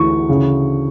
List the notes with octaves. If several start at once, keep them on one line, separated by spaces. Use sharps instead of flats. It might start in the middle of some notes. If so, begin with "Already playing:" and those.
Already playing: D2 E3 C#6
C#3